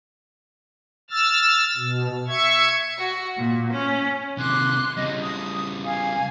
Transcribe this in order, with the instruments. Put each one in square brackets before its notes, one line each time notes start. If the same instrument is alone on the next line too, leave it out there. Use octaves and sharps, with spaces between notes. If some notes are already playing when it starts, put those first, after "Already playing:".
[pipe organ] E6 F6 A6
B2
E5 C#6 G#6
[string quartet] F#4
A#2
C#4
[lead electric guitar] C3 D#3 [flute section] C6 D6 F#6
[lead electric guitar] C#3 G3 [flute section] D#5
[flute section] D#6
F5 G#5